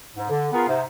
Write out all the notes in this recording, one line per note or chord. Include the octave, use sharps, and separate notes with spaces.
G#2
D3
B3 F4 G#4 A#4
G#2 C3